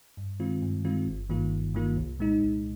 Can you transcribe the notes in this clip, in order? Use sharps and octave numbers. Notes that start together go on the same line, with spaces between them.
G2
D#3 G#3 C4 F4
G2
D#3 G#3 C4 F4
G1
G2 D#3 A#3 F4
G1
G2 D#3 A#3 F4
C2
A#2 G#3 D#4
C2